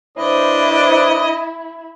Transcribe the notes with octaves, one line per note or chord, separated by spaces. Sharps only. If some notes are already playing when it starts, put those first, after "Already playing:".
D#2 D4 E4 B4 C5 D#5